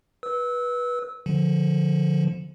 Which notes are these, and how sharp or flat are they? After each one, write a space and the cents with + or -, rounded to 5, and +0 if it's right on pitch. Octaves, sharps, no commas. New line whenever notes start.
B4 -20 E6 -25
D3 +0 F3 +0